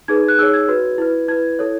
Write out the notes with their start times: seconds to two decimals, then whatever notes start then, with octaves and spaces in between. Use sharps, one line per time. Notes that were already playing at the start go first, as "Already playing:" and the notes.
0.08 D#4 G#4 B4 G#6
0.28 F#6
0.39 D#4 G#4 C#5 E6
0.53 G#6
0.68 F#4 B4
0.98 E4 B4
1.28 E4 B4 G#6
1.59 E4 A4 C#5